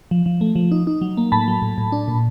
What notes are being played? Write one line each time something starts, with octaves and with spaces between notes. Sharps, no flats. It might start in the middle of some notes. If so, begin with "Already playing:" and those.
F3
F3
A3
F3
D#4
D#4
F#3
A#3
A2 A5 B5
F#3
A2
A2
D4
A#2